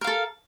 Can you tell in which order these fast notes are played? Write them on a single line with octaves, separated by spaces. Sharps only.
A#4 F5 A4